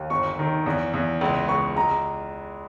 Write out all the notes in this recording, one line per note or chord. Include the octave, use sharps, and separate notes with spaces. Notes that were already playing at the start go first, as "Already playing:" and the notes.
Already playing: D#2
G1 C#6
D#3
E2
E2
C#2
C#2 C#6
C#2 A#5